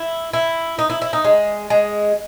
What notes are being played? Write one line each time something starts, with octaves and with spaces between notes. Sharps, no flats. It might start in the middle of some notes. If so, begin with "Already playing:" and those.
Already playing: E4
E4
D#4
E4
E4
D#4
G#3
G#3